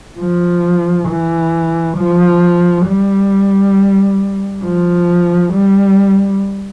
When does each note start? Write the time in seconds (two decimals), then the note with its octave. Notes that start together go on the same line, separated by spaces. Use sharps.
0.20 F3
1.09 E3
1.98 F3
2.86 G3
4.64 F3
5.53 G3